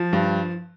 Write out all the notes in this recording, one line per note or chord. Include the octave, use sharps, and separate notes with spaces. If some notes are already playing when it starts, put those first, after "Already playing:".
Already playing: F3
G2